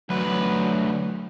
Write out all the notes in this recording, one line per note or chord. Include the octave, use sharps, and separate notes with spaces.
D2 F#3 B4